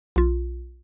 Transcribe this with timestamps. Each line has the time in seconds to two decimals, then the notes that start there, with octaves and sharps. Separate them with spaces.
0.16 B1 F4